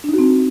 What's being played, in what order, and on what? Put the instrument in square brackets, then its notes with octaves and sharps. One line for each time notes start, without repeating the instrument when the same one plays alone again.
[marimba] D4
D#4
F#4
C4